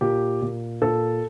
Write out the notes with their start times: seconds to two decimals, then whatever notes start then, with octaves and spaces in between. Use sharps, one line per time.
0.01 A#2 G4
0.42 A#2
0.82 A#2 A4